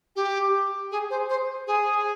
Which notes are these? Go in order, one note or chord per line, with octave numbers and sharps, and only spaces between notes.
G4
G#4
C5
C5
G#4